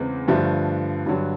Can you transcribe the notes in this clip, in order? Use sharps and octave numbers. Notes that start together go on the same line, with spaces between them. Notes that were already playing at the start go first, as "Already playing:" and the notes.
Already playing: E2 C#3 G#3 C4
G2 D3 F3 A3
G2 D3 F#3